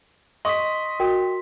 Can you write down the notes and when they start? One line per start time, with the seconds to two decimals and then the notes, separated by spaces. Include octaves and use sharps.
0.45 D#5 C6 C#6 D#6 B6
1.00 F#4 A#4 G5